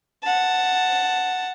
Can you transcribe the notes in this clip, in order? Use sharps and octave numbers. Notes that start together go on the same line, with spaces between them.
F#5 A5